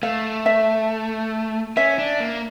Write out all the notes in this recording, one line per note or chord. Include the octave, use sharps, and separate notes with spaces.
A3 F5
E5
C#4 E5
D4
A#3